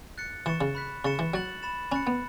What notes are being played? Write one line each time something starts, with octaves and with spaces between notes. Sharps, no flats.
F#6 A6 C#7
E3 C#6 A6 C#7 E7
C#3
B5 F#6 B6
C#3 C#6 A6 C#7 E7
E3
F#3 F#6 A6 F#7
B5 A6 E7
C#4 B5 F#6 A6 C#7
B3